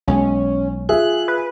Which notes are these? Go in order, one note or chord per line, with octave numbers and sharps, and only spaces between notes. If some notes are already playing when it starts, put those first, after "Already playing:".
B1 G#3 C#4
F4 G#4 E5 F#6
B4